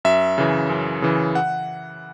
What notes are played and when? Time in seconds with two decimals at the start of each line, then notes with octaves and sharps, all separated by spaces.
0.05 F#2 E5
0.38 C#3 E3
0.69 F#2
1.02 C#3 E3
1.35 F#5